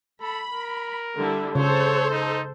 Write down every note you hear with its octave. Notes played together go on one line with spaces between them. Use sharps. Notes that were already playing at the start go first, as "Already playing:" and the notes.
A4 B5
A#4
D3 G3 E4
C#3 A4 C5 C#5
D#4